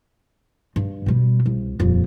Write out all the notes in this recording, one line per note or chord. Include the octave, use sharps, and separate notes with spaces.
G2
B2 G3
C2
D#1 F2